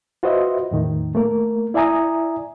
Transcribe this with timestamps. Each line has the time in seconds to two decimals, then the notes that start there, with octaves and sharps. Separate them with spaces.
0.23 F4 F#4 B4 C5 D#5 E5
0.71 E2 A2 D#3
1.15 A3 A#3 A#4
1.74 E4 D5 E5 G#5 A#5 D#6